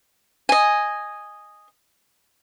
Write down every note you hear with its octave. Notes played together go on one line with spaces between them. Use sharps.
D#5 G#5